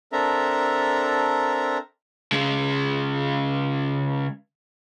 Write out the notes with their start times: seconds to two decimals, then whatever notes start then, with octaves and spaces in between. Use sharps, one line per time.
0.12 C4 D4 A4 A#4 E5 A#5
2.32 C#3 G#3